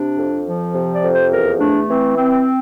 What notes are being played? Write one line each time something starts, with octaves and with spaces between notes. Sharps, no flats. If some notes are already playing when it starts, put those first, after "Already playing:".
Already playing: C3 D4
F2
F3
C3
D5
F2
C5
E2 A#4
A3 D4
E3 C4
C4